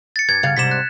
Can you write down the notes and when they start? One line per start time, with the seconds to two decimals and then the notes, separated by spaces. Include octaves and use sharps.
0.16 A6 C#7
0.29 G2 G#6
0.43 G2 C#3 F5
0.57 G#2 C3 G3 B6 E7
0.71 F#6